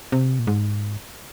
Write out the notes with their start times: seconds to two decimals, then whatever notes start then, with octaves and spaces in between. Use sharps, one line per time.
0.12 C3
0.39 A#2
0.47 G#2